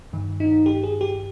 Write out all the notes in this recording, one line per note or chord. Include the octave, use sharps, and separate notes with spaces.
G2 D#3
D#4
G4
G#4
G4